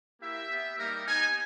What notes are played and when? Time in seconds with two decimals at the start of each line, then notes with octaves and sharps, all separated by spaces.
0.21 A#3 E4 G4 E5
0.49 B3 G4
0.78 G3 A#3 D#4 G4 A#4
1.06 B3 D#4 G4 G#5